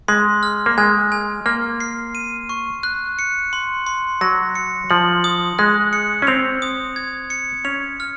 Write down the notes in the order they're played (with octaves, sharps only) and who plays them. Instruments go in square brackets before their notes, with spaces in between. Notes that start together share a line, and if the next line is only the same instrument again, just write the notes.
[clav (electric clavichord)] G#3 [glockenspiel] C6
[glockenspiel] F6
[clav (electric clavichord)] A#3
[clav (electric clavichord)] G#3 [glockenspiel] G#5
[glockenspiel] G#5
[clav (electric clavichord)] A#3 [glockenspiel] F6
[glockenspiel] C7
D#7
C#6
F#6
C#7
C6
C6
[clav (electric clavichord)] F#3 [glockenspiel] A#6
[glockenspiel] C#7
[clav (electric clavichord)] F3 [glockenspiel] F#7
[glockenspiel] D#6
[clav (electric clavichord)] G#3 [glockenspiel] F#6
[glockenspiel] C#7
[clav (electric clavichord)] C#4
[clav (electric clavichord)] C4 [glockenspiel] F7
[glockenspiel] D#6
G#6
C#7
[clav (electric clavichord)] C#4 [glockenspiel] F7
[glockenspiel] F6